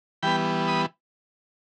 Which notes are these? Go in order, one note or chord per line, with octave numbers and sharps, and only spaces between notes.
E3 G3 B3 G5 B5
B5 D#6